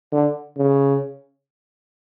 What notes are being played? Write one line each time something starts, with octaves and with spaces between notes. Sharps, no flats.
D3
C#3